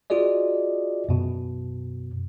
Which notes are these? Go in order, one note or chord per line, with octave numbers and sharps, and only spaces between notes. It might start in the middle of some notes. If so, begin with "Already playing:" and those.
F4 F#4 G#4 D5 D#5
F#2 B2